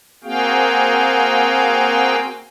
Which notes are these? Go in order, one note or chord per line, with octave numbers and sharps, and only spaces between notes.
A#3 C4 F#4 G#4 F5 G5